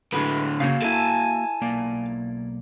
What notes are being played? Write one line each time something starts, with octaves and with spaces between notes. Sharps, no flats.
A2 D3 G#3 F#4 B4
C#3 F#3 A#3 F#4 F5
E4 A4 G#5 A5
B1 A#3 D5